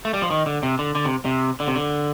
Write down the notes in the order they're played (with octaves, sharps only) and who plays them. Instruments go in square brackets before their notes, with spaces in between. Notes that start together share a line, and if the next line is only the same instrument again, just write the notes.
[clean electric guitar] A3
G3
F3
D#3
D3
C3
D3
D3
C3
C3
D3
C3
D3